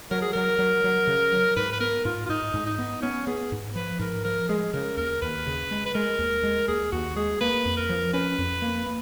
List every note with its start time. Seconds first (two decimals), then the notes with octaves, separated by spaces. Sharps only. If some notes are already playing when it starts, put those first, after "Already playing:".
0.11 F#3 A#4
0.22 G#4
0.33 F#3 A#4
0.59 F#3
0.84 F#3
1.07 C#3
1.32 F#3
1.56 G#2 B4
1.73 B4
1.80 B3 A#4
2.05 G#2 F4
2.26 F4
2.29 G#2 D#4
2.54 G#2
2.66 D#4
2.79 B3
3.02 B3 C#4
3.27 B3 G#4
3.52 G#2
3.75 F3 B4
3.99 G#2 A#4
4.24 F3 A#4
4.49 G#3 G#4
4.73 C#3 A#4
4.97 D#2 A#4
5.22 D#2 B4
5.47 C#3
5.71 G#3
5.86 B4
5.94 G#3 A#4
6.18 D#2
6.43 G#3
6.68 D#2 G#4
6.92 D#2 F#4
7.16 G#3 G#4
7.41 A#3 B4
7.66 F2
7.77 A#4
7.89 F3
8.13 C#4 B4
8.38 F2
8.62 A#3
8.86 A#3